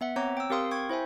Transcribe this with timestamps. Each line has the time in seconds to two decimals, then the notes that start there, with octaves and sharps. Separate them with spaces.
0.01 B3 E5 F#5
0.16 C4 C#5 A#5 D6
0.37 G5 E6
0.50 C4 G4 A#4 F5 C6 D#6
0.71 G5 C#6 G#6
0.90 E4 C5 E5 G#5